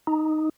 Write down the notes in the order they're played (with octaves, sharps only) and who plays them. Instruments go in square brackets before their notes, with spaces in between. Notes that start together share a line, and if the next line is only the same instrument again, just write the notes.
[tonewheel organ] D#4